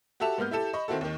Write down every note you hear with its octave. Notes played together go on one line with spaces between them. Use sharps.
F#4 G4 A4 E5 A5 F7
G#2 A#3 B3 F6 G6
E4 G4 A4 E7
D#5 B5 C#6
D#3 C4 E4 F#4 A4
D#2 D#3